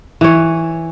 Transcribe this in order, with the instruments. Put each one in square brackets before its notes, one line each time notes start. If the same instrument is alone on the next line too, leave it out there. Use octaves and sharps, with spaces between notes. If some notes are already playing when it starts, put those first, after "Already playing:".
[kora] E3 C#5